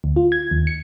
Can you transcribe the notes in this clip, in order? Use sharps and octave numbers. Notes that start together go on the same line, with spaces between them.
D2
F4
G#6
D#2
C#7